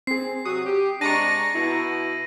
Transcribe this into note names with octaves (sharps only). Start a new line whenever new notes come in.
C4 G#4 C7
C3 F#3 F#4 D#6
G4
C3 G#3 D4 A5 A#5 C#6 A#6 D#7
B2 B3 E4